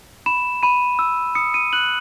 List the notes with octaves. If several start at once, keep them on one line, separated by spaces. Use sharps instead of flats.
B5 E7
B5 D#7
E6
D#6 C#7
D#7
F#6 F#7